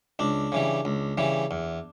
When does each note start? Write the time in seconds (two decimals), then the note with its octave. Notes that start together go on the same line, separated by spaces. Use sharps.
0.19 C#2 D4
0.52 C#3 E3 G3
0.85 C#2
1.18 C#3 E3 G3
1.51 E2